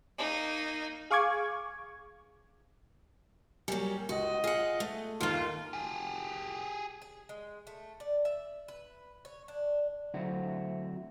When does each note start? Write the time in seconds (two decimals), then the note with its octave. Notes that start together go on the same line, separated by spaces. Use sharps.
0.18 A#3 D#4
1.11 G#4 F5 C#6 D6 G#6
3.68 F#3 G3 A#3 G#5
4.09 C#2 F#4 D#5
4.44 F4 G#4 F#5
4.80 A3
5.20 D#2 D#3 A#3 F4
5.73 G4 G#4
7.02 G#4
7.29 G#3
7.67 A3
8.00 D5
8.25 E5
8.68 B4
9.25 C#5
9.48 D4
10.14 D3 F#3 A3 C4 E4 F#4